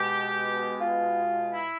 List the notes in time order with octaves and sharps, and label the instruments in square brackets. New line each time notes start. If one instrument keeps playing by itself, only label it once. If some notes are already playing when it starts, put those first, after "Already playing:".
Already playing: [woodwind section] B2 G#3 G4
F4
E4